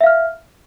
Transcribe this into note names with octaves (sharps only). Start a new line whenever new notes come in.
E5 F5 F6